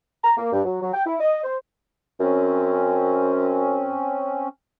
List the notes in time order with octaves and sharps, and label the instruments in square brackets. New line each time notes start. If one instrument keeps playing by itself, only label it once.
[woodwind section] A#5
A#3
G2
F#3
F#3
G5
E4
D#5
C5
[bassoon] F#2 [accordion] C4 C#4